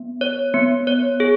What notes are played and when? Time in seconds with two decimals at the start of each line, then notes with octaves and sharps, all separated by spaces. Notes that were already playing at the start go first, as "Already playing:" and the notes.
Already playing: B3
0.21 C#5
0.54 B3
0.87 C#5
1.20 G#4